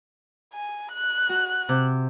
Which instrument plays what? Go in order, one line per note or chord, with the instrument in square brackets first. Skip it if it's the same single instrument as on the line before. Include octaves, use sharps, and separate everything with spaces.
[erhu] G#5
F#6
[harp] F#4
C3